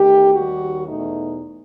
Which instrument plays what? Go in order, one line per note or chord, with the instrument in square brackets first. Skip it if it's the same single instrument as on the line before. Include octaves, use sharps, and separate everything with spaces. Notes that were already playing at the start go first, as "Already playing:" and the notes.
Already playing: [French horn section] E2 D#3 A3 G4
D#2 D#3 G3 F#4
E2 B2 A3 D#4